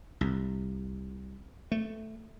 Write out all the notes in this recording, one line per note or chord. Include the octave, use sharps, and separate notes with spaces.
C2
A3